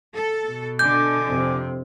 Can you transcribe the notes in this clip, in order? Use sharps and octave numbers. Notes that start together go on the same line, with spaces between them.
A4
B2
D3 D#5 G#5 D6 G6
F2 C3